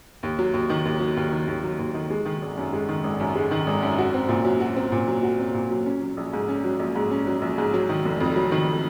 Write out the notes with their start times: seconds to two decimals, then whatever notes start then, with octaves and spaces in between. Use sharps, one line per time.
0.23 D#2
0.39 F#3
0.53 D#2
0.70 D#3
0.85 D#2
1.00 F#3
1.17 D#2
1.32 D#3
1.47 D#2
1.63 F#3
1.79 D#2
1.94 D#3
2.10 G#3
2.25 D#3
2.42 G#1
2.57 F#2
2.73 G#3
2.88 D#3
3.04 G#1
3.20 F#2
3.35 G#3
3.51 D#3
3.67 G#1
3.82 F#2
3.98 F#4
4.14 C4
4.29 A#2
4.45 F#3
4.60 F#4
4.76 C4
4.92 A#2
5.08 F#3
5.23 F#4
5.39 C4
5.54 A#2
5.71 F#3
5.86 C#4
6.02 F#3
6.17 A#1
6.33 G#2
6.48 C#4
6.64 F#3
6.79 A#1
6.95 G#2
7.11 C#4
7.27 F#3
7.42 A#1
7.58 G#2
7.74 F#3
7.89 D#3
8.05 F1
8.20 F2
8.36 F#3
8.51 D#3